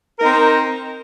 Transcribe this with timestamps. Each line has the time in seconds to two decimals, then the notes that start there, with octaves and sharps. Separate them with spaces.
0.19 A#4
0.22 D#4
0.25 C4